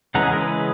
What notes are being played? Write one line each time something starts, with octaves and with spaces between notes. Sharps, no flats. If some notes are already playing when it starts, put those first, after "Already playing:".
C#3 E3 G#3 C#4 F#5 A#5
G#4
A#4
G#4 B4